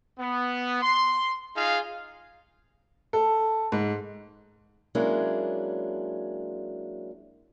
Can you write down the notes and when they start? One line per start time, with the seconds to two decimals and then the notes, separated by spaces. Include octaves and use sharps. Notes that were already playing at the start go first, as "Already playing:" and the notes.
0.19 B3
0.82 C6
1.56 D#4 F4 G#4 F5
3.13 A4
3.72 G#2
4.95 F#3 G#3 A#3 C#4 D4 E4